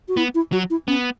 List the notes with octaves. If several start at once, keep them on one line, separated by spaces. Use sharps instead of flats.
F#4
B3 E4
E4
F#3 F#4
E4
B3 C#4